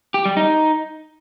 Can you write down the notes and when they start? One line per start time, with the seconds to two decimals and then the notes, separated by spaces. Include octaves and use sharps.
0.14 G4
0.25 G3
0.37 D#4